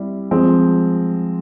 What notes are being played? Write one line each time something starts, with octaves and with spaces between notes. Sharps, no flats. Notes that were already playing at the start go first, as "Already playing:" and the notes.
Already playing: G3 C4 E4
F3 G#3 C4